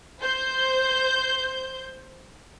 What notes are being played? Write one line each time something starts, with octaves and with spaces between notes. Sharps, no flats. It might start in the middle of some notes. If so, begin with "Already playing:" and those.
C5 G6